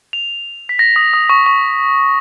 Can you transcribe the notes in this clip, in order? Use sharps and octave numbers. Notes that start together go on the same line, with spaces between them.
F7
B6
A#6
D#6
D#6
C#6
C#6